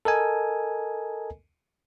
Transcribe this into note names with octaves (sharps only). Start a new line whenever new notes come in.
A4 A#4 D#5 G#5